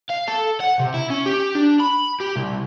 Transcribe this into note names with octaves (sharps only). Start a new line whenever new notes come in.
F5
A4
F#5
C3
E4
C#4
G4
D4
B5
G4
C2